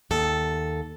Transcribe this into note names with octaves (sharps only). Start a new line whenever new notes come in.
D#2 A4